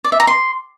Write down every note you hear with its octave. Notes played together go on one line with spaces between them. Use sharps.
D5
E5
A#5
C6